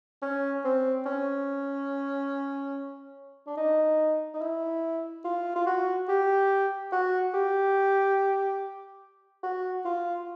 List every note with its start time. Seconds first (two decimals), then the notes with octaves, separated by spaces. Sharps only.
0.22 C#4
0.64 C4
1.06 C#4
3.47 D4
3.57 D#4
4.34 D#4
4.41 E4
5.24 F4
5.56 F4
5.66 F#4
6.09 G4
6.92 F#4
7.34 G4
9.43 F#4
9.85 F4